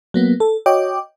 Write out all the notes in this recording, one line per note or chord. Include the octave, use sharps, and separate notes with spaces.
F#3 A#3 B3
A4
F#4 C#5 D#5 G5 D6